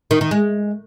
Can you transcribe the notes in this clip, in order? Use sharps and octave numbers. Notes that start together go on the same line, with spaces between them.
D#3
D#3
G#3